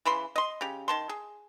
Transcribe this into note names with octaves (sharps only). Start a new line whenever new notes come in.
C#3 E3 B5 C6
D#5 C6
C#3 G4
D#3 A5 C6
G#4